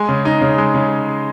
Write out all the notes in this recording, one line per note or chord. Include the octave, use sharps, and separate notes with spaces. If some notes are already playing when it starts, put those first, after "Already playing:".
Already playing: G#3 G#5
C#3
D#4
C#3
G#3
C#3